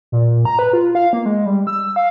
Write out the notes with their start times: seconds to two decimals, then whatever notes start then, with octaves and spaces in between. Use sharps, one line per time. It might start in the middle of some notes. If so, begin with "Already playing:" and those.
0.12 A#2
0.45 A#5
0.59 B4
0.73 F4
0.95 F5
1.13 A#3
1.26 G#3
1.46 G3
1.67 E6
1.96 F5